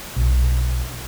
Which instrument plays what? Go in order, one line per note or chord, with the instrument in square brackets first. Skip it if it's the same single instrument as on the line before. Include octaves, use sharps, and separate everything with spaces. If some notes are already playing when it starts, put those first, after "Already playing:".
[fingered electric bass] B1